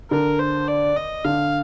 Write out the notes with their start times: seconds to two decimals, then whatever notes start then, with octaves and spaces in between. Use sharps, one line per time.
0.11 D3 A#4
0.39 C5
0.68 D5
0.96 D#5
1.24 D3 F5